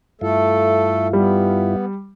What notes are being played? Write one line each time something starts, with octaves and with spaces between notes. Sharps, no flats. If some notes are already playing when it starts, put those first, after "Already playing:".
G2 A3 E4 F4 A4
G3 B3